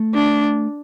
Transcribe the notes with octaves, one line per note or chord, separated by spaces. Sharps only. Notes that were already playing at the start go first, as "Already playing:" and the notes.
Already playing: A3
D4